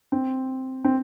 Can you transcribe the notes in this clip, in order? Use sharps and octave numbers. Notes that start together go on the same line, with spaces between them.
C4
C4